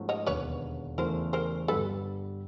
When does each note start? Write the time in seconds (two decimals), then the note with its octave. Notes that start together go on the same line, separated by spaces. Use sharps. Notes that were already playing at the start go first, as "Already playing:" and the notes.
Already playing: G#2 F3 A3 C#4 F#4
0.09 C#5 D#5
0.26 E1 D#2 D3 B4 C#5
0.98 E2 C#3 E3 A3 A#4 C5
1.33 A#4 C5
1.68 G1 G2 D3 G3 A4 B4